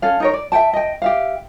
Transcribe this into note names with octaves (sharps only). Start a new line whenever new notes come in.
C#4 A4 F5
D#4 A#4 C#5
D5
E5 F#5 G5 A5
D#5 G5
G4 E5 F5